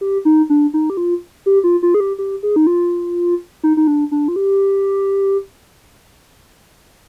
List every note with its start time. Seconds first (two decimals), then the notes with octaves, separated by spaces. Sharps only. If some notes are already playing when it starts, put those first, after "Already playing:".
0.01 G4
0.25 D#4
0.50 D4
0.74 D#4
0.90 G4
0.97 F4
1.46 G4
1.64 F4
1.83 F4
1.94 G#4
2.00 G4
2.19 G4
2.43 G#4
2.56 D#4
2.67 F4
3.63 D#4
3.77 D#4
3.87 D4
4.11 D4
4.28 F4
4.36 G4